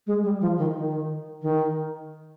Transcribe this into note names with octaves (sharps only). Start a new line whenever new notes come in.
G#3
G3
F3
D#3
D#3
D#3